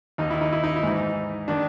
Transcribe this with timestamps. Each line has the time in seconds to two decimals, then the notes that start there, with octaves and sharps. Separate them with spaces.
0.18 D#2 D#3 D#4
0.31 E4
0.41 D#4
0.52 E4
0.64 D#4
0.76 E4
0.83 G#2 E3 D#4
1.48 D#3 D4